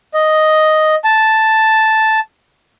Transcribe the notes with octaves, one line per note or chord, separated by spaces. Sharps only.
D#5
A5